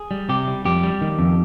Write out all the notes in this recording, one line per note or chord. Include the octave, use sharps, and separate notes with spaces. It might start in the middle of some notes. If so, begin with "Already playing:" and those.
Already playing: G#4
G3
C3 G4
G3
F2 G4
G3
D#3
F2